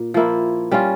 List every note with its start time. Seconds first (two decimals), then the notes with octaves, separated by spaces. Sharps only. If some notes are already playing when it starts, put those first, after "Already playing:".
Already playing: A#2
0.14 F3 A#3 E4
0.71 G3 C#4 F4